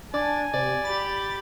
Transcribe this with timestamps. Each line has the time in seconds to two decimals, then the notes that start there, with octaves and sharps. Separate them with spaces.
0.14 D4 D5 G#5
0.54 C3 D5
0.85 G4 B5 A6